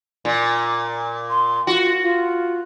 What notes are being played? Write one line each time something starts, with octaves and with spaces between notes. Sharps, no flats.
A#2
C6
F4 F#4
F4